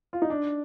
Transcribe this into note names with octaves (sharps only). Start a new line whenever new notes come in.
F4
D#4
D4